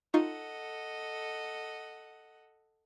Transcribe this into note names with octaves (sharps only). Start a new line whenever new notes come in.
D#4 F4 A4 D#5 F#5 C#6